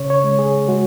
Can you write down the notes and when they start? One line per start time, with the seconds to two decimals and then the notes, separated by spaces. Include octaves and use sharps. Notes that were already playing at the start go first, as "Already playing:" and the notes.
Already playing: C#3 C#5
0.10 C#5
0.24 G#3
0.39 G#4
0.68 G#3 F#4